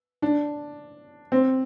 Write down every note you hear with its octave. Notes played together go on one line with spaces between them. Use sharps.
D4
C4